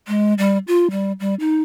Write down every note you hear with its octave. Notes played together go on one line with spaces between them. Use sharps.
G#3
G3
F4
G3
G3
D#4